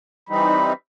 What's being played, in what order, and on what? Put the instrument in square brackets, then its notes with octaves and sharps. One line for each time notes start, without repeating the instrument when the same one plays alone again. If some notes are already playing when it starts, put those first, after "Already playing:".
[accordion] E3 G3 C4 D#4 [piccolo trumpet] B5